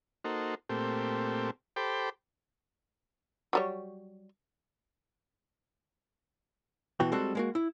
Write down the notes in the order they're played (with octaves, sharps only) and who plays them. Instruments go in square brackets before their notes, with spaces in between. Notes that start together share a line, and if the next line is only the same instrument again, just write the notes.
[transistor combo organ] A#3 D#4 F#4 A4 C5
A#2 A3 C4 G4
G4 A4 C5 G5 B5 D6
[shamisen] F#3 G3 C#5
[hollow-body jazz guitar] C2 B2 E3 F#4 G5
G3 G#3 C4 F#4 A4 F#5
G#3 A#3 F#4
E4